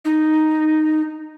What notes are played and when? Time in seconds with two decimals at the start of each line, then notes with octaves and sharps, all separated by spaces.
0.05 D#4